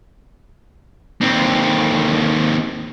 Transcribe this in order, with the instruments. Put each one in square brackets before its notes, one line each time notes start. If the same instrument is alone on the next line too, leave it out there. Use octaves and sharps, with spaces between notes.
[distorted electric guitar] D#2 C4